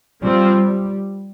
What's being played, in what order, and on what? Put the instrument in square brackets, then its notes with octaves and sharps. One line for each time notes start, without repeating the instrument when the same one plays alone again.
[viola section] F3 C4 F4 [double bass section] G3